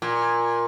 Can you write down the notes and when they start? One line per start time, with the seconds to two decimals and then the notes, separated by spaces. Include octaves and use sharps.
0.02 A#2